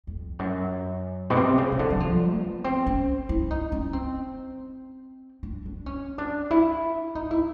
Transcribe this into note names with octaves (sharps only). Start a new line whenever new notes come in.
F2
F#2
B2
C3
C#3
C#3
D3
F#3
F3
B3
C4
C#4
E4
D#4
C#4
C4
D4
D4
C#4
D4
E4
D#4
E4